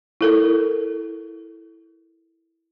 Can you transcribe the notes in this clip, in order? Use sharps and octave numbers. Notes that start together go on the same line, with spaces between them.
E4 A4 A#4